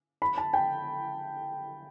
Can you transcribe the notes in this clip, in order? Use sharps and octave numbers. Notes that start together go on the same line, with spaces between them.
B5
A5
G5